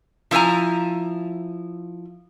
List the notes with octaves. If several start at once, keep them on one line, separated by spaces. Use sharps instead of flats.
F3 E4 B4 G#5 A#5